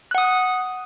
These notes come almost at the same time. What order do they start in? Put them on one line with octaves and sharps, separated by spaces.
F#6 F#5 D#6